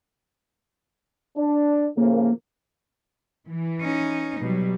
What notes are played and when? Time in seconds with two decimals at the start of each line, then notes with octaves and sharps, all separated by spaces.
1.37 D4
1.97 A2 C#3 F3 A#3
3.48 E3
3.81 C#4 D#4
4.41 B2 F#3 G3